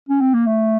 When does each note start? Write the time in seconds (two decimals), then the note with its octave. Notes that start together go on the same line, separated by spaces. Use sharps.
0.09 C#4
0.21 C4
0.34 A#3
0.47 A3